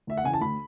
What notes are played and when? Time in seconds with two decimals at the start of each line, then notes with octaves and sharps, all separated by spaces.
0.07 D2 E5
0.17 F#5
0.24 C#3 E3 G#5
0.34 A5
0.41 D2 B5